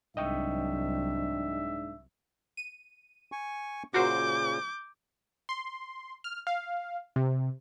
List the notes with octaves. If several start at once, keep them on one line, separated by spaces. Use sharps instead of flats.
C2 G#2 F#3 D4 D#5 E5 G5 C#6
D#7
G#5 C#6
A#2 C#3 F#4 A#4 C5 D6 G6
C6
F6
F5
C3